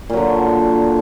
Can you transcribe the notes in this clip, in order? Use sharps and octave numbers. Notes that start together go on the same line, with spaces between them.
A#2 D3 F#3